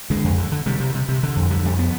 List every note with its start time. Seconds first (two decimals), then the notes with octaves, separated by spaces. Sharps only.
0.10 D3 G#3
0.24 F2
0.38 D3
0.52 D3
0.66 C3 G3
0.80 C3
0.95 C3
1.08 C3
1.23 D3
1.36 F2
1.50 D3 G3
1.65 F2 G3
1.79 B3